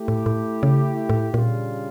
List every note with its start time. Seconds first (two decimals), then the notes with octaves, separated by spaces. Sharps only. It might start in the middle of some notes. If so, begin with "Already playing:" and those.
Already playing: A3 E4 G4
0.08 A2
0.26 A2
0.63 C#3
1.09 A2
1.33 A#2 C#3 G3 D4 F4